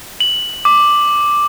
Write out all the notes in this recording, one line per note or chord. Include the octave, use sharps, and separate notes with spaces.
F#7
D6